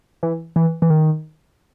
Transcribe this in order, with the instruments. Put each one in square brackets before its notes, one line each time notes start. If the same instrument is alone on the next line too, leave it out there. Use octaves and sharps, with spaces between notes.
[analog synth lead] E3
E3
E3
D#3